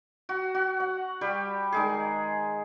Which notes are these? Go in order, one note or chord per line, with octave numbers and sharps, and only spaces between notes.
F#4
F#4
F#5
G3 G4
D#3 G#3 G#4